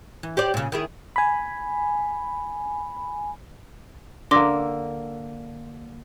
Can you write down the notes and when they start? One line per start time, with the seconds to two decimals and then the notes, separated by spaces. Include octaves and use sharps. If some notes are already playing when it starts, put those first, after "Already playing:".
0.23 E3
0.37 G4 C5 D5
0.54 A#2 C#3
0.72 D#3 E4 G#4
1.16 G#5 B5
4.31 D3 A#3 C6 D6 A#6